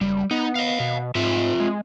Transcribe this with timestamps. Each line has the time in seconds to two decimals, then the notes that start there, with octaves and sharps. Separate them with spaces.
0.01 F#1 G3
0.31 B3 D#4
0.55 D#5 F5
0.80 B2
1.15 G#2 C4 F4 E5
1.60 G#3